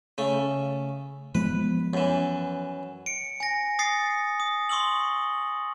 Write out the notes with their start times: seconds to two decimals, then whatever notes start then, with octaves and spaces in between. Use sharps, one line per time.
0.18 C#3 A3
1.35 F3 G#3 B3 B4
1.93 F#2 E3
3.06 C#7 D7
3.40 G#5 A#6
3.79 D#6 A6 C7 C#7
4.40 D#6
4.69 C6 C#6 D#6 E6 F#7